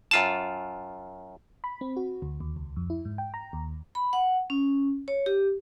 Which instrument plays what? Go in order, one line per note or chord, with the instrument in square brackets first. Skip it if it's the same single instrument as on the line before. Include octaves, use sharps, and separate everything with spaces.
[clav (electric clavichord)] F#2 F4 A5
[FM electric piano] B5
C4
F#4
D2
D#2
C#2
F2
E4
G#2
G5
A#5
D#2
[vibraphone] B5
F#5
C#4
C#5
G4